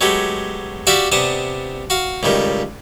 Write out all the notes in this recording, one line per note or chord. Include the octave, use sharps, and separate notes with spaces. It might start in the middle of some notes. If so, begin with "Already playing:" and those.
F#3 G#3 A3 B3 G4
F#4 G4 D5 E5 F5 G5
C3 B3 D4 A5 D#6
F#4 F5
C#2 A2 D#3 G3